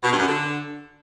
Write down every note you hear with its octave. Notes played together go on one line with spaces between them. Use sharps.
B2
G2
F#2
D3